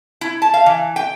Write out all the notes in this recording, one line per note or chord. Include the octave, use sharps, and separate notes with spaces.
E4
A5
F5
E3
G5